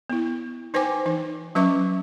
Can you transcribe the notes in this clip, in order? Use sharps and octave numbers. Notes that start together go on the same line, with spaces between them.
B3 E4
D#4 B4 C5 G5 G#5 D6
E3 D#4
F#3 C#4 B4 E5 C#6 D6